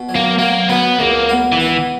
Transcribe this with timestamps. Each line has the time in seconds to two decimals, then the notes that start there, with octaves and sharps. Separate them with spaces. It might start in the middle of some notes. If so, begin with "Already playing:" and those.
Already playing: B2
0.09 F#3
0.16 A#3
0.39 F#3 A#3
0.69 F#3 B3
0.99 C#2 A#3
1.29 B3
1.52 E3
1.60 B3